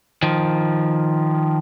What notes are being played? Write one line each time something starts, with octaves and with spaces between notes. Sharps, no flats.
D#3 F3